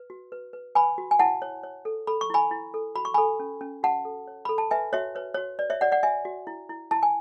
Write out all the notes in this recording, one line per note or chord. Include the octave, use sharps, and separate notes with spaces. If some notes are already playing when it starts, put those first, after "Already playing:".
Already playing: B4
F#4
B4
B4
B4 G#5 B5
F#4
G#5
E4 F#5 A5
C#5
C#5
A4
A4 B5
C#6
E4 G#5 B5
E4
A4
F#4 B5
C#6
A4 G#5 B5
C#4
C#4
F#4 F#5 A5
A4
C#5
A4 B5
A5
B4 E5 G#5
F#4 C#5 E5
B4 C#5
F#4 C#5
B4 D5
C#5 E5
F#4 D5 F#5
D5 F#5
F#4 E5 G#5
F#4
E4
E4
E4 A5
G#5